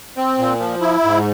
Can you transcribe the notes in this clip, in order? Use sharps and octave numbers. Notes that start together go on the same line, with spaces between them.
C4
A#2
F3
E4
G#2